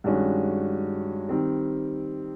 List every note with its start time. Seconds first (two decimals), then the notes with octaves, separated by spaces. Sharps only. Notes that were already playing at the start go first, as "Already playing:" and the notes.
0.04 G2 D#3 G#3 C#4 F#4
1.29 D#3 G3 C4